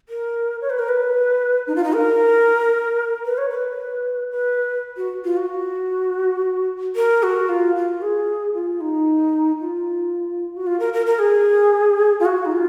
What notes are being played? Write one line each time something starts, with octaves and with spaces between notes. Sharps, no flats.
A#4
C#5
B4
A#4
B4
D#4
F4
D#4
A#4
B4
C#5
B4
B4
F#4
F4
F#4
A#4
F#4
F4
F4
G#4
F4
D#4
F4
F#4
F4
A#4
A#4
A#4
G#4
F4
F#4
D#4
F4